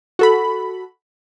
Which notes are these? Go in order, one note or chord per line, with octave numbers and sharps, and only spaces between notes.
F#4 A4 B5